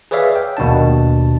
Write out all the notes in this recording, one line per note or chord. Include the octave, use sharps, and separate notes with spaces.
G#4 B4 C#5 D5 E5 F5
G5
D#2 B2 D4 A5